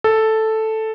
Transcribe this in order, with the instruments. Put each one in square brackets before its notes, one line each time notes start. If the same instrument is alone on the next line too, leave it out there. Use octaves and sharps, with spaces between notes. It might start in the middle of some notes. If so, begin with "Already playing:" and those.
[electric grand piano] A4